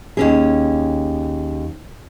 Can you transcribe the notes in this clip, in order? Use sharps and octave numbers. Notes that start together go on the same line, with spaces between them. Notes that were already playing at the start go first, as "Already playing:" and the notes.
D#2 C#4 G#4